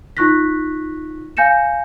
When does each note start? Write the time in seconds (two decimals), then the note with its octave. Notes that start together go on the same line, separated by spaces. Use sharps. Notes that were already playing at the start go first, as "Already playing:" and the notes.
0.17 D#4 F4 C#6 F#6 A#6 B6
1.37 F5 G#5 G6 A#6 C#7 E7